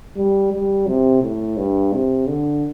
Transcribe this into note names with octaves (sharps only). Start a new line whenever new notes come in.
G3
G3
C3
A2
G2
C3
D3